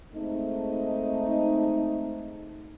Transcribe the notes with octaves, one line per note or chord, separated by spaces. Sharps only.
G#3 A3 C4 D#4